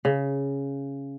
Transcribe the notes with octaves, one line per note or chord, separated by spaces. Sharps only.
C#3